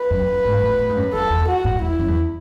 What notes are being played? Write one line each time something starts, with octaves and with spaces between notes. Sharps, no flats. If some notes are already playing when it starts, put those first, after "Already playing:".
Already playing: B4
F#2
F#2
G#2
A2
A2
G#2
F#2
F#2 A4
E2
F#4
A2
E2 E4
F#2
E2